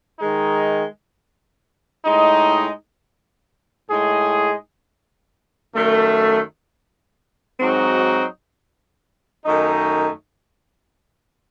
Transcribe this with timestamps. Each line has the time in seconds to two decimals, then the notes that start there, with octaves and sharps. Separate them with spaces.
0.19 D#3 G#3 D#4
2.05 A2 G#3 D#4
3.90 A2 G#3 D#4 G#4
5.75 F#2 D#3 A3
7.60 G#2 F#3 C4 D#4 F#4
9.45 F#2 D#3 A3 D#4